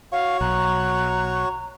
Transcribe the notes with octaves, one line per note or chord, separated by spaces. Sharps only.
F#4 C#5 F5 C#6
B1 A#5 F#6